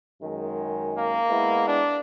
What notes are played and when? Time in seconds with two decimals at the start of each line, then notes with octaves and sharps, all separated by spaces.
0.22 F#2 D#3 G#3
0.97 A#3
1.29 G#3 B3 E4
1.68 D4